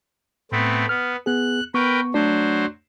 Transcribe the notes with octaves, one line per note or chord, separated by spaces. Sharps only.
A2 A3 B3 C4
B3 F6
B3 G#4 F#6
B3 A#4 B4 G5 C#6
F#3 A3 D4 C5 D5